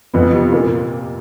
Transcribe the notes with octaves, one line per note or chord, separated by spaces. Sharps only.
F2 B3
C3
A#2 A#3